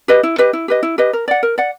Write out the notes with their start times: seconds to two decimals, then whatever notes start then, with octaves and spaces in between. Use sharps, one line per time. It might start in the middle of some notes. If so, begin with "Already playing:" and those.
0.08 G4 B4 D#5
0.23 E4
0.38 G4 B4 D#5
0.53 E4
0.68 G4 B4 D#5
0.83 E4
0.98 G4 B4 D#5
1.13 A#4
1.28 D5 F#5
1.43 A#4
1.58 D5 F#5